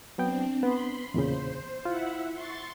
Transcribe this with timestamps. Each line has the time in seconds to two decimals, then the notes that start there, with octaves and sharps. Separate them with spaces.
0.18 F#3 B3 C4 D4 G5
0.63 B3 B5 C6
1.14 E2 A#2 C#3 C5
1.85 E4 F4 E5 F#5
2.33 C6 C#6 A6